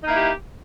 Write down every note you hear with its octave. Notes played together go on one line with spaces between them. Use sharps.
A#3 D#4 E4 G4